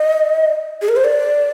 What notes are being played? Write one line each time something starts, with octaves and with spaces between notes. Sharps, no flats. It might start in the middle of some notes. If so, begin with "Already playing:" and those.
Already playing: D#5
G#4
A#4
C5
D5